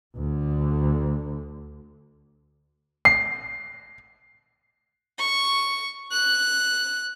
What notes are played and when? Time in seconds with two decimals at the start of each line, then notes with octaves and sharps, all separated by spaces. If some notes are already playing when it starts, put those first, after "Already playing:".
0.16 D2 D3
3.05 C7
5.19 C#6
6.11 F#6